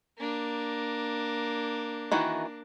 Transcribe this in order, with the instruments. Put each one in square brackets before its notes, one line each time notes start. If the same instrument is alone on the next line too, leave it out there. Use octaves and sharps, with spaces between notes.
[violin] A#3 D4
[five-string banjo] D#3 E3 F#4